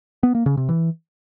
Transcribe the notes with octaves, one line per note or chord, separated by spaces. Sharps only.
B3
A#3
C#3
C3
E3